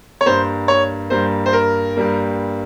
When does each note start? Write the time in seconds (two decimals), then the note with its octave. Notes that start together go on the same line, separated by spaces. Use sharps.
0.21 C#5
0.25 G2 G3 A#3 C5
0.68 C#5
1.10 G2 G3 A#3 C5
1.46 C5
1.53 A#4
1.96 G2 G3 A#3